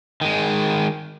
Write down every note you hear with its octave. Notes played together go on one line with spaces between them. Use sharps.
D#3 G#3